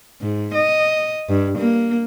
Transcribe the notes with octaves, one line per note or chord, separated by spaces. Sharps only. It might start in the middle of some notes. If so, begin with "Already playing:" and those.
G#2
D#5
G2
A#3